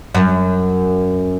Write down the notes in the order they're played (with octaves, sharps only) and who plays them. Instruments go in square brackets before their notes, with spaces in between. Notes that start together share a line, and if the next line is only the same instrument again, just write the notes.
[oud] F#2